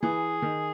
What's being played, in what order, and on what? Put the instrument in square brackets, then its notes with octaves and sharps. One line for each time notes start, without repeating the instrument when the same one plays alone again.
[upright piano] E3 [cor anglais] G#4
[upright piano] D#3